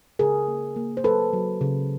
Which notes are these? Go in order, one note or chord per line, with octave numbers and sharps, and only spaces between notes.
C#3 G#4 A#4
A#3
A#3
C5
F#3 A4 B4
F#3
C#3